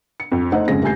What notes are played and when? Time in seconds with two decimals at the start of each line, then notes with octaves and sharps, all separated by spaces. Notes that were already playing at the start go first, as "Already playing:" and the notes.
0.20 C#7
0.32 F2
0.52 A3 D#4 A4 C5 D#5 F#5
0.68 F#1 F2 G#2 C#3 G#4 A#6
0.82 D#1 A3 G4 G#5 G6 C7